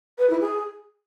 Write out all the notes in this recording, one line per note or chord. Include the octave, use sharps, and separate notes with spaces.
B4
E4
G#4